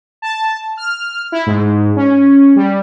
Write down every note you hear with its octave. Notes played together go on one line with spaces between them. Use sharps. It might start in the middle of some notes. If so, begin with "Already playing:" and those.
A5
F6
E4
G#2
C#4
G3